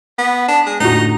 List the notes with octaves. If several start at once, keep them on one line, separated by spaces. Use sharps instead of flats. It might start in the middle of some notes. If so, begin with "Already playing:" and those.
B3
D4
G#3
A2 D3 D#4 F#4